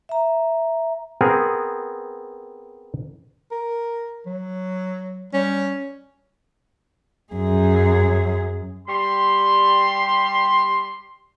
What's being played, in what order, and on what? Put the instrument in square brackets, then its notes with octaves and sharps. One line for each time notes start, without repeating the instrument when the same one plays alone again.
[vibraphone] E5 A#5
[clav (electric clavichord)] B3 C4 G#4 A#4
[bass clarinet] A#4
F#3
[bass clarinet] G3 [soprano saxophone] C#4
[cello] F#2 G#4
[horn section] G3 C6